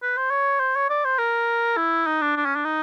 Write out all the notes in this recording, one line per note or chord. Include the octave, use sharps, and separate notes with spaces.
B4
C5
C#5
C5
C#5
D5
C5
A#4
E4
D#4
D4
D4
C#4
D4
D#4